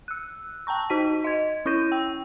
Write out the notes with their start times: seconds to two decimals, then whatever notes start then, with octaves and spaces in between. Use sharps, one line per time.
0.08 E6 F#6
0.67 G5 A5 A#5 C#6
0.90 D#4 F#4 B6 D#7
1.24 D#5 G#6
1.65 C#4 E4 C#6 G6 A#6 D#7
1.92 G5